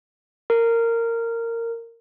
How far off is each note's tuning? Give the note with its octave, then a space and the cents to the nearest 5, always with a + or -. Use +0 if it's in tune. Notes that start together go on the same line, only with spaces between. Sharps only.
A#4 -15